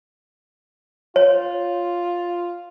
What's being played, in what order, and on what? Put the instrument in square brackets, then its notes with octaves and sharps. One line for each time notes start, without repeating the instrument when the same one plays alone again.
[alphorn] F4 [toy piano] C#5